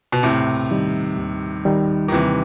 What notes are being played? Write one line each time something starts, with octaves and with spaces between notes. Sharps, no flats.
B2
D#2 A2 C3
D#3 G3 D#4
D#2
D#3 G3 D#4
D#3
D#2 C3 E3